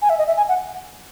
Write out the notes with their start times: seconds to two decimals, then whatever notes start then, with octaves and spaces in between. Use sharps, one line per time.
0.02 G#5
0.10 E5
0.19 D#5
0.27 E5
0.37 G#5
0.49 F#5